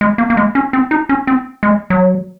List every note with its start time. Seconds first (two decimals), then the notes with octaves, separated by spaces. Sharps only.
0.01 G#3
0.18 A#3
0.30 A#3
0.37 G#3
0.55 C#4
0.73 C4
0.91 D#4
1.09 C#4
1.27 C4
1.63 G#3
1.90 F#3